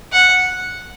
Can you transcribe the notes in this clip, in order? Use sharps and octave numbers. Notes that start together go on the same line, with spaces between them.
F#5